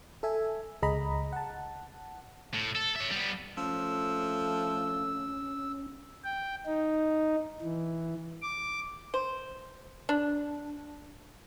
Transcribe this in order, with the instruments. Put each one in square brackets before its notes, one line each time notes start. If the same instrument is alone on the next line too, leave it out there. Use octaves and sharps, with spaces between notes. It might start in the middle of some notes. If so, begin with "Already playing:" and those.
[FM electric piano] A4 E5 G#5
C#2 G#4 D#5 A#5 B5
F#5 A5
[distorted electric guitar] A2
A4
C#5 E5
G3 B3
[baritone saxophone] F3 [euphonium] A3 [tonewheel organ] C#4 [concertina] E6
[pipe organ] G5
D#4
E3
D6
[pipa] C5
D4